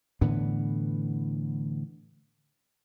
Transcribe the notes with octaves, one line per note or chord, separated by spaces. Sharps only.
A2 D3 E3 B3